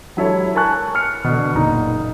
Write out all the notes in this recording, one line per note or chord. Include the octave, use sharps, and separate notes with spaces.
F#3 G#3 E4 G4 A4 C#5
A#4 G#5 A5 C#6 F#6
F6 C#7
B2 D3
F#1 A#2 D#4